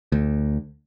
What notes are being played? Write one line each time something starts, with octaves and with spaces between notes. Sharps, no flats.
D2